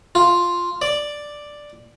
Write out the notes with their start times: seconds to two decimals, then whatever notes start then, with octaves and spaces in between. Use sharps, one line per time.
0.15 F4
0.82 D5